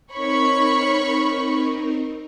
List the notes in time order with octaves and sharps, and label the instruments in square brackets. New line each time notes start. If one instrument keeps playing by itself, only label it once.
[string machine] C4 D#4 A#4 [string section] C#5 B5 C#6